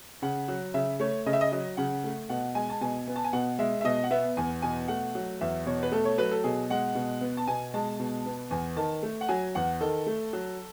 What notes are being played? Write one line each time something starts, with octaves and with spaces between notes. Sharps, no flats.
C#3 F#5
F#3
C#3 E5
A3 C#5
C#3 D#5
E5
D#5
F#3 D#5
C#3 F#5
A3
B2 F#5
G#3 G#5
A5
B2 G#5
B3
A5
G#5
B2 F#5
G#3 E5
E5
B2 D#5
F#5
B3 E5
E2 G#5
B2 G#5
A3 F#5
F#3
E2 E5
B2 C#5
B4
A3 A4
C#5
F#3 B4
A4
B2 G#4
G#3 F#5
B2
B3
A5
B2 G#5
G#3 A5
B2
B3
E2 G#5
D#3 A5
A3
F#5
F#3 G#5
E2 F#5
D#3 A4
A3
F#3